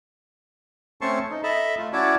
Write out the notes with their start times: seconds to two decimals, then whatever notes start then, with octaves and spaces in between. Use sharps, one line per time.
1.01 A3 C4 C#4 A5 C6 C#6
1.30 D#4
1.43 A4 D#5 E5 A5 B5
1.78 A3 F4
1.93 C#4 E4 F#4 C#5 D5 A5